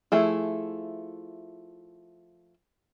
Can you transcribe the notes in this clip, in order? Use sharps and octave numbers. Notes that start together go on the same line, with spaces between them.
F3 A3 E4 G#4